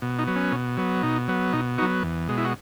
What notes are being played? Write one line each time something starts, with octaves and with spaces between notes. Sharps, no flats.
B2
D#4
F#3 B3
C#4
B2
F#3 B3
B2 D#4
F#3 B3
B2 D#4
F#3 B3 D#4 F#4
E2
B2 G#3
E4
F#4